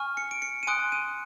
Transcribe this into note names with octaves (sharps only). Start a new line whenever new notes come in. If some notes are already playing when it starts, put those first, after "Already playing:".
Already playing: G#5 C#6 F6
C#7
D7
C#7
D#7
G#5 C6 D#6 F#6 D7
D#7